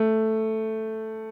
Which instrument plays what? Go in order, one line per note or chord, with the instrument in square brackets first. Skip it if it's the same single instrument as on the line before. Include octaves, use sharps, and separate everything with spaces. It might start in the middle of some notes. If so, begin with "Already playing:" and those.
Already playing: [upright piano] A3